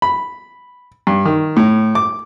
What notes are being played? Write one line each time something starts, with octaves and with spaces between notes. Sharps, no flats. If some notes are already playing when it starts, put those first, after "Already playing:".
B5
G2
D#3
A2
D6